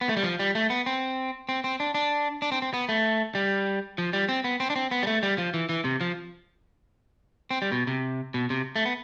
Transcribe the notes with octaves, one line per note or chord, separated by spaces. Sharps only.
B3
A3
G3
F3
G3
A3
B3
C4
C4
C4
D4
D4
D4
C4
C4
B3
A3
G3
F3
G3
C4
B3
C4
D4
C4
B3
G3
A3
G3
F3
E3
E3
C3
F3
C4
G3
B2
C3
B2
C3
A3
B3